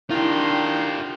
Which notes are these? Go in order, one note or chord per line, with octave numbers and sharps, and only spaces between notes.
D#3 D4 E4 F4 G4 C6